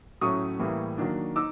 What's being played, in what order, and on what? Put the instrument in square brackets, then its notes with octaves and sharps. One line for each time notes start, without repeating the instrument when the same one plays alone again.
[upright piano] A2 F#3 A3 C#4 C#6 D#6
A2 E3 G3 A#3
D#3 F#3 A#3 D4
D#4 D6 E6